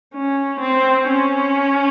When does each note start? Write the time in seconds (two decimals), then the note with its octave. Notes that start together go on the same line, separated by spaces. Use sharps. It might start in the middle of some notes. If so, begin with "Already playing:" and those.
0.14 C#4
0.60 C4
1.07 C#4